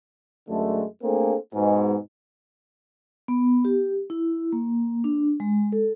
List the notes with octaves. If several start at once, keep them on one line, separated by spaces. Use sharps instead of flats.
F#2 D3 G#3 A3
A3 A#3 C4 D4 G#4 A4
G#2 B2 G#3
B3
G4
E4
A#3
D4
G#3
A4